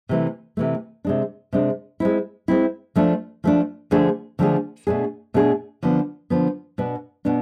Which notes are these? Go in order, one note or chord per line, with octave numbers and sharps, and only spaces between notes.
C3 E3 A3
C3 E3 A3
C3 G#3 D4
C3 G#3 D4
G#3 C4 E4
G#3 C4 E4
F3 A3 D4
F3 A3 D4
D3 F3 A3 D4 G#4
D3 F3 A3 D4 G#4
B2 A3 D4 G#4
B2 A3 D4 G#4
D3 F3 B3
D3 F3 B3
B2 B3 D4
B2 B3 D4